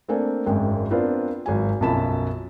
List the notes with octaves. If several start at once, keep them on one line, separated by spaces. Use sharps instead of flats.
A3 A#3 C4 D4 A4 G#5
G#1 F#2 G#3 G5
B3 C4 D4 F4 A#4 B4
G#1 F#3 G#5
B1 F#2 F3 A5 B5 E7